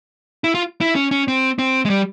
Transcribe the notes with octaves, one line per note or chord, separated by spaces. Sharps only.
E4
F4
E4
C#4
C#4
C4
C4
G#3
G3